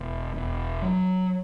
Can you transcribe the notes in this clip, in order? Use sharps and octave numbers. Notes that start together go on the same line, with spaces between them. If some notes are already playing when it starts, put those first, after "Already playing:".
Already playing: E1
E1
F#3